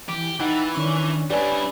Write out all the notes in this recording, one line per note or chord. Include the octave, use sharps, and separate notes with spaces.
E3 G4
E3 D#4 F#5 G5 B5 E6 A6
D#3 C#4 D4 C#6
G3 E4 G4 B4 C#5 D5 G#5